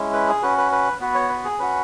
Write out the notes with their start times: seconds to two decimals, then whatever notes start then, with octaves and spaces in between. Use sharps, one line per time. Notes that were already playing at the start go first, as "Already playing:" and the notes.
Already playing: G#3 C#4 E4
0.13 B4
0.28 G#4
0.42 C#4 F#4 B4
0.58 B4
0.72 B4
1.00 B3 F#4 B4
1.15 C#5
1.29 B4
1.44 G#4
1.59 C#4 F#4 B4